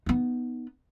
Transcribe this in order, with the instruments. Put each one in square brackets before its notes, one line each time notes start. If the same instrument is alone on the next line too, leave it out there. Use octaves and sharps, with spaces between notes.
[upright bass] B3 D#4